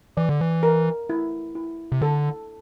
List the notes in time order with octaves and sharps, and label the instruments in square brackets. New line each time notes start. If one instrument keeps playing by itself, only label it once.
[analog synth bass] E3 [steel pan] D5
[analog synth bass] D3
E3
[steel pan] A#4
E4
E4
[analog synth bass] C3
[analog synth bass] D3 [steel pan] A4